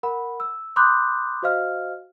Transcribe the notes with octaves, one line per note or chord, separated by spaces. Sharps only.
A#4 F#5 B5
E6
B5 C6 D6 D#6 F#6 G6
F#4 C5 D#5 F5 F6